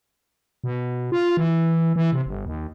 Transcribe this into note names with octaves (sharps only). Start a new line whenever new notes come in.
B2
F4
E3
E3
C3
G1
D#2